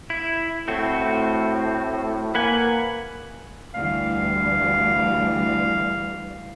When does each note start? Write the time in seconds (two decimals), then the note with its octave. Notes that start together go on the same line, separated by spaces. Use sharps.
0.10 E4
0.68 A2 A3 C4 F#4
2.35 A#3 B4 F#5 G#5
3.74 D2 E3 G3 F5